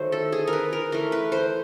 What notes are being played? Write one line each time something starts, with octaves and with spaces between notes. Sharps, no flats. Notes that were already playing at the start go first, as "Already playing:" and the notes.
Already playing: D#3 F#3 A3 C5
A4
G#4
A#4
B4
A#4
E3 A3 A#4
B4
C5